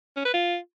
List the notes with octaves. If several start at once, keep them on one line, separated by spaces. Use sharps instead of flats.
C#4
B4
F4